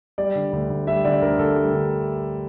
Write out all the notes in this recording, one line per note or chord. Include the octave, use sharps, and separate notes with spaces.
G3 D5
D3
D2
D2
G3 E5
D3 D5
D2 A#4
D2 A4
G3
D3